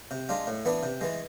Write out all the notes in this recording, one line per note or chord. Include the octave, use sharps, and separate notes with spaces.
C3
G#3 D4 F4
A2
E3 B3 D4
C3
E3 G#3